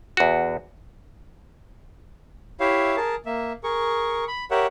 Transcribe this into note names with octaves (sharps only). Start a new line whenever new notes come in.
E2 F#4
E4 G4 C#5 E5 F5
G#4 A#4 A5
A#3 E5
G#4 A#4 C#6
B5
G4 A#4 C#5 E5 F#5